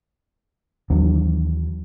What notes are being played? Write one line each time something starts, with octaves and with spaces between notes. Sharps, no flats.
D#2 E3 F#3 D4